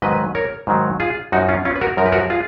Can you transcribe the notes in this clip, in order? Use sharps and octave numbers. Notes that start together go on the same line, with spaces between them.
G#2 D#3 F#3 B4 D#5
A#4 C#5
G#2 D#3 F#3
F4 G#4
F#2 F3 D#4 F#4
C#4 F4
C#4 F4
B4
F#4 A#4
F#2 F3 A#4
B4
F#4 A#4
F4 G#4